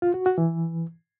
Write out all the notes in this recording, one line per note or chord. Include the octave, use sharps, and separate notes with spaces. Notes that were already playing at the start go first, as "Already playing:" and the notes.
F4
F#4
F#4
E3